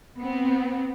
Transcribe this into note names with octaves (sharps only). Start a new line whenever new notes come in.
B3 C4